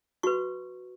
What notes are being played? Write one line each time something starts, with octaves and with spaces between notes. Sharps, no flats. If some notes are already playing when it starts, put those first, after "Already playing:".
F#4 B4 C#6